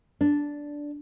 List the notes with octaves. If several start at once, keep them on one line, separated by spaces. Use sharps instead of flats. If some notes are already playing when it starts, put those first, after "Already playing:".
D4